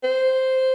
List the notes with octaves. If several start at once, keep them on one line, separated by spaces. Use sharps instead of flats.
C5